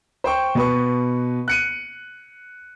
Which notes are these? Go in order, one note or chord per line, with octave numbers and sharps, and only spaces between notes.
C5 G5 C#6
B2 B4 C#6
F#6 C#7 D#7